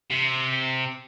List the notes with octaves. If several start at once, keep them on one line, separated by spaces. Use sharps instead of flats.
C3